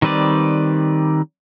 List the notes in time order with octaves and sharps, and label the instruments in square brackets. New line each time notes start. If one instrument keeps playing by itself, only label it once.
[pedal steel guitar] D#3 G3 C4 B4 D5